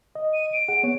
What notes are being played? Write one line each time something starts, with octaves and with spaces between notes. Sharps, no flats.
D#5
D#7
D7
G#4 F#5
B3 C#5